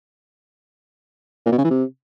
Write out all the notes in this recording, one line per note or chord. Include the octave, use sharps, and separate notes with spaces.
A#2
B2
C#3
E3
C3